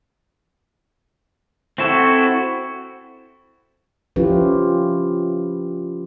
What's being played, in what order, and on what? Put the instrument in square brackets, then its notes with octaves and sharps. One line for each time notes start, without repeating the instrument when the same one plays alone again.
[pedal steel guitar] C4 E4 F#4 A4
[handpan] F3 C#4 E4 F4 G4 B4